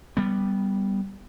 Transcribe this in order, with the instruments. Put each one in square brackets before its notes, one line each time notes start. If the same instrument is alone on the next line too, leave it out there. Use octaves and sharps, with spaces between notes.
[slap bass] G3 B3